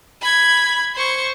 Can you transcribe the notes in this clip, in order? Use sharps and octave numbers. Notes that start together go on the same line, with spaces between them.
B5 G#6
C5 C#6